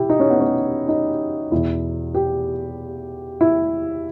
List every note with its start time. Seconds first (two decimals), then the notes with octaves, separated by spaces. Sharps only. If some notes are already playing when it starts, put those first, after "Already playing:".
Already playing: B2 E4 G4
0.09 D#4
0.20 C#4
0.30 B3
0.40 C#4
0.89 D#4
1.52 E2 B2 E4
2.15 G4
3.41 E4